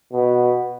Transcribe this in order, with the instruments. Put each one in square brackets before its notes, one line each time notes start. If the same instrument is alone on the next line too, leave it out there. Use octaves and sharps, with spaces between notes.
[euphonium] B2